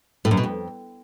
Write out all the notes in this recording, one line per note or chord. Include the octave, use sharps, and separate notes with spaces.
A2
F#2
B2
F2